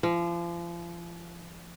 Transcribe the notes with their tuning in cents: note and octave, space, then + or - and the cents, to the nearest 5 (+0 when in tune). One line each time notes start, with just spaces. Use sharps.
F3 -35